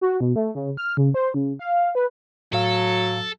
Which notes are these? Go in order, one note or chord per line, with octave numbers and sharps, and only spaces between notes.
F#4
B2
A3
C#3
F6
C#3
C5
C#3
F5
B4
A2 F#3 A4 F5